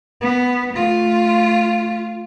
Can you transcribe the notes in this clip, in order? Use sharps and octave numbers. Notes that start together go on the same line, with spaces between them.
B3
A3 F4